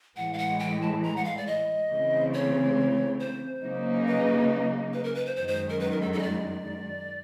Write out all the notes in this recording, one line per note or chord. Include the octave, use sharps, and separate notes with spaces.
A2 E3 G#3 F#5
F5
F#5
G5
A5
A#5
F#5
F5
D5
D#5
C#3 E3 A3 C4
C#5
C5
C#3 F#3 A#3 D#4
B4
B4
A#4
B4
C5
F#2 D#3 G#3 C5
C5
A#4
B4
A#4
A4
A4
D#5
D5